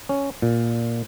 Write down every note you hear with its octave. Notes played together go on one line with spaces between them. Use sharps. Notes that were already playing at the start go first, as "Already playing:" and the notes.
C#4
A#2